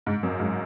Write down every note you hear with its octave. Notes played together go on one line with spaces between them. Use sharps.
G#2
F#2
G#2